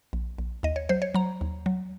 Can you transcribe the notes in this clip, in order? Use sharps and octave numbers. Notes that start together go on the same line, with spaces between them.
A#1
A#1
D#2 D#5
C#5
F#3 C5
C#5
F#3 A#5
D#2
F#3